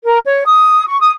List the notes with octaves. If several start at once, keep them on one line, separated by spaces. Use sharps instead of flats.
A#4
C#5
D#6
C#6
D#6